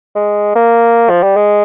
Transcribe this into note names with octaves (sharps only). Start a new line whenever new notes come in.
G#3
A#3
F3
G3
G#3